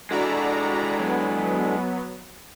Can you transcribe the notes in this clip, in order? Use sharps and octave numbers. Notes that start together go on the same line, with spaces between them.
G#3 D4 E4 F#4 A4 D5 A#5
F#3 B3